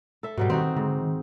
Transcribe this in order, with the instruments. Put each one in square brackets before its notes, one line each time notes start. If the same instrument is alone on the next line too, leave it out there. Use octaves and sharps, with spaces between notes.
[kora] A4 E5
[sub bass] G#2 [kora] B2 F#3 G3
[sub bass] D#3 [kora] C4 D#4 F#4
[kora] G#2 [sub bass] D3
[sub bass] D#3